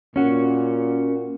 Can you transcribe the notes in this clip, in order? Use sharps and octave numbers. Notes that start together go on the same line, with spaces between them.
A#2 C#4 F#4